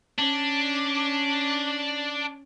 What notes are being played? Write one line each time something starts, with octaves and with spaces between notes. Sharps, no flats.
C#4 D4